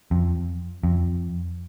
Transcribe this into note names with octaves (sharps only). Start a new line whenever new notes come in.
F2
F2